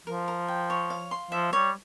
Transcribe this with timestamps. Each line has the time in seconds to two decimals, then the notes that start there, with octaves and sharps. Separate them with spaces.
0.07 F3 A#4
0.28 A#4
0.48 G5
0.70 C#5
0.90 F5
1.11 C6
1.31 F3 E5
1.53 G3 C#5